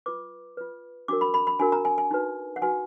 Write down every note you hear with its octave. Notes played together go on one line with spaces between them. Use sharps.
F4 B4 D6
F4 B4
D4 F#4 A#4 D6
B5
B5
B5
D4 F#4 A#4 G#5
A#5
G#5
G#5
D#4 F#4 B4
F#5
D#4 F#4 B4 G#5